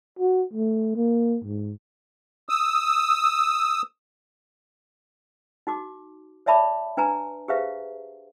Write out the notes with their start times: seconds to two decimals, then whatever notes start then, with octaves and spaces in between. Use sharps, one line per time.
0.19 F#4
0.54 A3
0.96 A#3
1.44 G#2
2.49 D#6 E6
5.67 D#4 F#4 D6
6.46 C#5 D5 E5 A5 B5 D6
6.97 D4 B4 G#5 A#5
7.48 G4 G#4 B4 C5 E5 F5